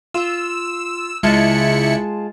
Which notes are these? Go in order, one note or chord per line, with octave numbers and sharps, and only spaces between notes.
F4 E6
C#2 G#3 E4 F4 A5 C#7